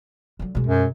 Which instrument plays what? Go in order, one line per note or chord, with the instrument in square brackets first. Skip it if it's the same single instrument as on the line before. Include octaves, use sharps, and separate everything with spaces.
[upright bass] D3 F#3
B2 G#3
[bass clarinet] F#2